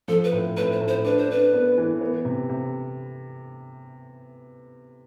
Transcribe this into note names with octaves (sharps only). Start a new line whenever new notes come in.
F3 A4
B4
A2
A2 B4
C5
A2
C5
D4 B4
C5
D4 B4
B3
E3
B3
C3
C3